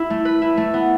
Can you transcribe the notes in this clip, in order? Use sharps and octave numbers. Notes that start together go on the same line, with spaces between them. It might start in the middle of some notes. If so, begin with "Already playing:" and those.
Already playing: E4
A3
B4
E4
A3
B3